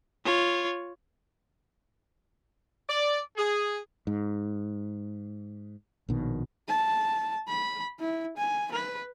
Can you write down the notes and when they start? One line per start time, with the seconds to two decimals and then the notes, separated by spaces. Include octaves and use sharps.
0.25 F4 C#5
2.89 D5
3.37 G#4
4.07 G#2
6.09 A#1 B2 D#3
6.68 A5
7.48 B5
7.99 E4
8.37 G#5
8.72 B4